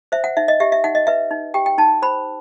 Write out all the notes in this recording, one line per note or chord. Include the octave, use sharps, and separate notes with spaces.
C5 E5
F#5
D#4 E5
D#5
G4 E5
E5
D#4 F#5
D#5
B4 E5
D#4
G4 G5
G5
D#4 A5
C5 B5